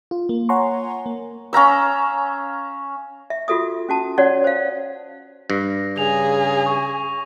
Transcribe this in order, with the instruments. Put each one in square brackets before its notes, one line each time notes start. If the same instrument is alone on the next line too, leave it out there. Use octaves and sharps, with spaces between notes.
[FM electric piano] F4
A#3
C#5 F#5 G#5 A#5 C6 C#6
A#3
[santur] C#4 F5 A#5 E6
[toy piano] E5
F4 F#4 A4 E5 D#6
C#4 F#4 A5
C#4 F#4 C#5 D5 F#5
C5 F5
[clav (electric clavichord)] G2 [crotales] A#6
[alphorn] C#3 [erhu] G#4 [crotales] F7
[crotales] C#6